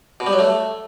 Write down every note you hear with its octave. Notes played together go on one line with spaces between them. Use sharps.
B2
G3
F#3
A3